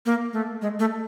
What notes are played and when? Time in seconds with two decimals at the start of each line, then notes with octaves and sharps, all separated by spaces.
0.06 A#3
0.33 A3
0.62 G#3
0.80 A3